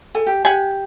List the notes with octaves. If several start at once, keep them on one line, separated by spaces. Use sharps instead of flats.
A4 G#5
G4
G4 F#5 G#5